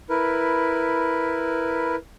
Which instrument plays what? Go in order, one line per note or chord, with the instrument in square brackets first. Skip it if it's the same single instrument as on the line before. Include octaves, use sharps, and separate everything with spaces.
[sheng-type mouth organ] E4 A#4 B4